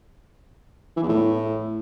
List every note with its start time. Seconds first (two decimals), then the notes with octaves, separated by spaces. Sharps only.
0.96 E3
1.03 E2
1.09 A2